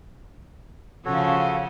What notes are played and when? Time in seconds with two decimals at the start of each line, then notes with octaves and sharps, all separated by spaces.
1.05 C#3 F3 C#4 F#4 A4 C#5